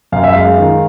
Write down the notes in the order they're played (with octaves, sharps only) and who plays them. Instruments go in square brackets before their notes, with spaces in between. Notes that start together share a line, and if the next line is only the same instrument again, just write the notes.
[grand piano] F#2 F5
E5
G#3 F5
D#3